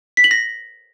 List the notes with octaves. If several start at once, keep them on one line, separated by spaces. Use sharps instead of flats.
B6
F#7
A#6